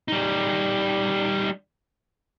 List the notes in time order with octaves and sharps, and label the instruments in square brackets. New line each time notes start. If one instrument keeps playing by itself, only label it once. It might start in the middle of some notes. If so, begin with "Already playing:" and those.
[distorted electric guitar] G3 D#4